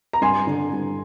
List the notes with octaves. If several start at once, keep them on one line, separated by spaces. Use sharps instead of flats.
A#5
G2 G#5 C6
D3
G2